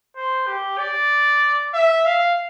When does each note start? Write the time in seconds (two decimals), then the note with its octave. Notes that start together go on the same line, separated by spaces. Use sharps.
0.16 C5
0.47 G4
0.79 D5
1.74 E5
2.06 F5